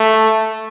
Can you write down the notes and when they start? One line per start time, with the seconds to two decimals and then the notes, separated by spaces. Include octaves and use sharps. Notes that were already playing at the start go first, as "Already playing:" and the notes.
Already playing: A3